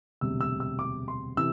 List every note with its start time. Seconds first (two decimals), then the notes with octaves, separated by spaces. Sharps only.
0.21 E1 D2 C3 G3 E6
0.41 E6
0.60 E6
0.79 D6
1.08 C6
1.37 C3 E3 E6